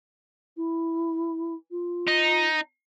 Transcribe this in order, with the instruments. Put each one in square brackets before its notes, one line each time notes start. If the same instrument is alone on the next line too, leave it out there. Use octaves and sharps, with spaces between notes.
[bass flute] E4
F4
[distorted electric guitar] D#4